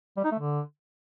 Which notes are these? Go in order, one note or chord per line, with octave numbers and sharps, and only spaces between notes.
G3
D#4
A3
D3